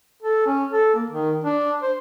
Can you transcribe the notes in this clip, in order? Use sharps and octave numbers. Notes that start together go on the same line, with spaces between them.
A4
C#4
A4
A#3
D#3
D4
C5